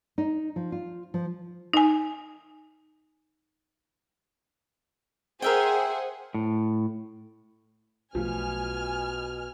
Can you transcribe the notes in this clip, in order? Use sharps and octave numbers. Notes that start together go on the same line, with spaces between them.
D#4
F3
F4
F3
D#4 G#5
G#4 A#4 C5 E5 F#5 G5
A2
B1 B2 F3 A3 G#5 F6